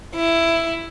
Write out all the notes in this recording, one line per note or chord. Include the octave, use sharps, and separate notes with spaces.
E4